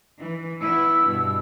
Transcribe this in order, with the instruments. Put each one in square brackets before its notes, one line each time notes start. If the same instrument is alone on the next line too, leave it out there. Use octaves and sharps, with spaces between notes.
[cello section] E3
[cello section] B3 E4 [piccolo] E6
[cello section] G2 B2